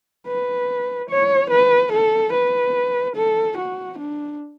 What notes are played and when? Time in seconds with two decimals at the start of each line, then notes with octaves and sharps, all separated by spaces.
0.27 B4
1.09 C#5
1.50 B4
1.92 A4
2.33 B4
3.16 A4
3.57 F#4
3.98 D4